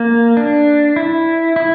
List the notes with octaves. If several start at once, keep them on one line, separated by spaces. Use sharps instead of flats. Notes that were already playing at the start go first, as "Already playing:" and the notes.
Already playing: A#3
D4
E4
E4